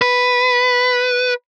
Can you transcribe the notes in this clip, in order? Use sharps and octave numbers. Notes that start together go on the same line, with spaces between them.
B4